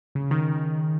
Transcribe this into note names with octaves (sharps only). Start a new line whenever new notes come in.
C#3
D#3